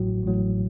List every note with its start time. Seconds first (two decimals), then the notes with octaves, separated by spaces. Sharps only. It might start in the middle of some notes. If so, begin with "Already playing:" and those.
Already playing: A1 A2 F#3 F#4
0.24 A1 A2 F#3